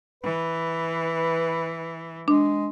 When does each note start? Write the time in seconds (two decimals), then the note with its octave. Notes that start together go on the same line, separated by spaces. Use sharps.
0.24 E3 B4
2.28 G#3 D4